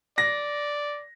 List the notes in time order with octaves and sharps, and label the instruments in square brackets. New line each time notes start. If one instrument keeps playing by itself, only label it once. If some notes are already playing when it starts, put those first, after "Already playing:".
[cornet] D5 [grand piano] A#6